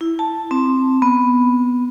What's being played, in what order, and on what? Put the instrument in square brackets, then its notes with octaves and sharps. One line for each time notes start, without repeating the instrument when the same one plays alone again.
[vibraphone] E4
A5
C4
B3